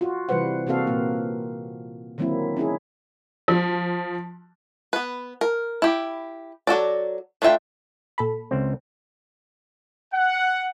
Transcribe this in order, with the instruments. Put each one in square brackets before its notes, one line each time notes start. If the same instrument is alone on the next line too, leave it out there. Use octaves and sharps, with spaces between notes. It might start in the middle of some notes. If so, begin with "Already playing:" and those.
[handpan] F4 F#4
C3 E3 G3 B4 C5 F#5
C3 A#3 C4 F#4 A4 F5
A#2 A#3
D3 D#3 F#3 A#3 C4 E4
C#4 D#4 E4 G#4
[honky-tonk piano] F3
[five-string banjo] B3 B4
A#4
E4 G4
F#3 F#4 A4 D5
A3 D4 F4 E5 G5
[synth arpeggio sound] A#2 A4 B5
[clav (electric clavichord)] C#2 C4
[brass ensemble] F#5